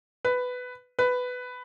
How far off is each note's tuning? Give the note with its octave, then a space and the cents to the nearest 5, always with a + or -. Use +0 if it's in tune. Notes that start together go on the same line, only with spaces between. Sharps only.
B4 +10
B4 +10